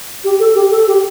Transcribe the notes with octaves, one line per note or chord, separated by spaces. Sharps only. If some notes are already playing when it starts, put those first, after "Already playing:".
G4
A4
G4
A4
G4